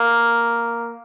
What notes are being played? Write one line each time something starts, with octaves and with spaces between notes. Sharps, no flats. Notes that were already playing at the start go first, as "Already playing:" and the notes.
Already playing: A#3